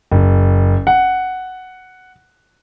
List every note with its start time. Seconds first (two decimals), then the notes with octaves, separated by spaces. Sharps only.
0.12 F#1
0.87 F#5